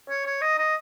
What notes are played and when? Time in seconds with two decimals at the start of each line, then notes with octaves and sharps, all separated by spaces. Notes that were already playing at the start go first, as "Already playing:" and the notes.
0.09 C#5
0.25 C#5
0.41 D#5
0.58 D#5